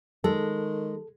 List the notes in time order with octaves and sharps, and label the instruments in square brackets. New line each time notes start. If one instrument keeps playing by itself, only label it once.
[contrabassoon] D#3 [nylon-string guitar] G#3 [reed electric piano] A4